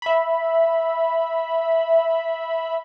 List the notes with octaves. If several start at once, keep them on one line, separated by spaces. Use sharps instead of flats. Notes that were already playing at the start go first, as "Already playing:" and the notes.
E5 B5